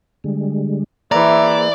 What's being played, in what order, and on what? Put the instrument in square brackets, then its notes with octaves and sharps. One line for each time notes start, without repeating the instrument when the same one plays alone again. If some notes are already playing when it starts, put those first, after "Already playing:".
[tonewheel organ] D3 G3 G#3
[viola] E3 E5 [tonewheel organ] A#3 G#4 C5 [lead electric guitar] D5 [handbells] A#5